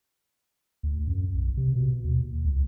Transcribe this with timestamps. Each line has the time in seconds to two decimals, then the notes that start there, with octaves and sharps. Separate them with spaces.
0.83 D2
1.07 F#2
1.34 B1
1.57 C3
1.76 B2
2.04 D#2
2.44 C#2